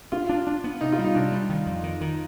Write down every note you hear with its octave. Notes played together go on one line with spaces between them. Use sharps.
D4 F4
D4
D4
B3
C3 D#4
F4
G3
D#4
C3 D4
G3
D#3
F2
D#3
D#3